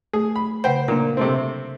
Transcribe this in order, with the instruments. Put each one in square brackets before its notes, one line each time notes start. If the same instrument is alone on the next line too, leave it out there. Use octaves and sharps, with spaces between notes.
[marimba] A3 [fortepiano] G#4
[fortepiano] B5
[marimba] C#3 B4 F#5 [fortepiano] C5 G5
[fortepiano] A#2 [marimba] A#3 D4 A#4
[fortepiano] C3 A3 C4